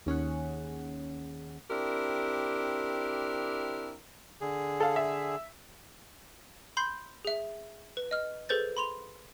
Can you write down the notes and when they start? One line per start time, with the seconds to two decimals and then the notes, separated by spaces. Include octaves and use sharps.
0.06 D#2 C#4 G#4 F#5
1.70 C4 D4 E4 G4 A#4
4.41 D3 G#4
4.80 A4 F5
4.96 E5
6.77 B5 C6 G6 C7
7.25 G#4 E5
7.97 B4
8.11 D#5 F6
8.49 G#4 A4 B4 C5 G6 A6
8.77 B5 C6 F7